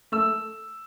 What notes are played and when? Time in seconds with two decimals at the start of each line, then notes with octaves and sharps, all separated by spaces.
0.12 A3 E6